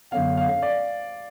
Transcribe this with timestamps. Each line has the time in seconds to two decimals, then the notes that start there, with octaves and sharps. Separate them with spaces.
0.12 F#2 D3 F#3 B3 F5
0.37 F5
0.63 D5